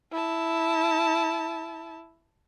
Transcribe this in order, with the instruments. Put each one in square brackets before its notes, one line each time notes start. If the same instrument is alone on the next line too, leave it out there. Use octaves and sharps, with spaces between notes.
[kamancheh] E4 A5